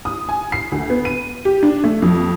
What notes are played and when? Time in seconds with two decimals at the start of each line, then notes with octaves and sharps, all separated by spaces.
0.05 D#6
0.29 G#5
0.52 C7
0.72 D2
0.90 B3
1.05 D#7
1.45 G4
1.63 D4
1.84 A3
2.02 F2